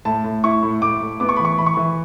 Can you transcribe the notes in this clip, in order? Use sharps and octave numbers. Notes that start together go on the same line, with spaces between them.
A2 A5
A2
E4 C#6
A2
A2 D6
A2
B3 D6
C#6
E3 B5
C#6
E3 B5
C#6
E3 B5